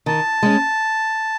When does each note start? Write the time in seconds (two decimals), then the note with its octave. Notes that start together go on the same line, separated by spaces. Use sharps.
0.06 D#3 A5
0.43 G#3 C#4